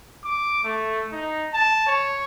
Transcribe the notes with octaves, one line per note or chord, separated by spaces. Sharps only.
D6
A3
D#4
A5
C#5